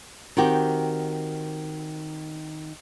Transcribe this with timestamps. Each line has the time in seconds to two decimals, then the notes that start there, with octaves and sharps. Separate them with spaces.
0.37 D#3 C4 F#4 G4